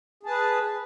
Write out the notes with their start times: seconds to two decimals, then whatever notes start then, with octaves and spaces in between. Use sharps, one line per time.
0.23 G#4
0.26 A5
0.29 B4